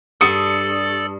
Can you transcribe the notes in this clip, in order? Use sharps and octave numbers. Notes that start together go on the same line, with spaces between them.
G2 A4 D5 D#6 C#7